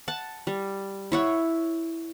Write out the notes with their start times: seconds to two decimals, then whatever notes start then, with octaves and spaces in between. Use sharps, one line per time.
0.08 F#5 A5
0.47 G3
1.12 E4 C#5 F#5